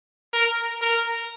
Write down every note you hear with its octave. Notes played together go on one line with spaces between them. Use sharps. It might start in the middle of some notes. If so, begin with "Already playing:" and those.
A#4
A#4